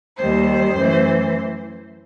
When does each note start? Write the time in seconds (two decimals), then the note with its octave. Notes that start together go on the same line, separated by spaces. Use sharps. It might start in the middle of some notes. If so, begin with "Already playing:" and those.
0.18 D#2 D#3 G3 C5
0.75 F#2 E3 A3